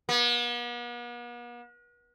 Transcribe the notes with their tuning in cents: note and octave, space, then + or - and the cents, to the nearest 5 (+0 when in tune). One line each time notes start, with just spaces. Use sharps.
B3 -45